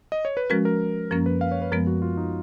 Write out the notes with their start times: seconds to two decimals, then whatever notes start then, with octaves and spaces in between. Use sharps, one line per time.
0.12 D#5
0.25 C#5
0.37 B4
0.50 F3 G#3 C#4 F#4 A#4
0.65 A#4
1.11 F#2 F3 A#3 C#4 A#4
1.26 B4
1.41 F5
1.52 C#5
1.62 B4
1.72 F#2 F3 G#3 B3 A#4
1.87 F#4
2.02 F4
2.17 D#4